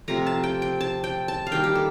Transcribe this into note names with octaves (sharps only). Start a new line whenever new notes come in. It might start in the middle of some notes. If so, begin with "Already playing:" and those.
C3 F3 A3 A#5
A5
G5
G5
A5
G5
A5
F5
D#3 G3 A#3 G5
G4
A4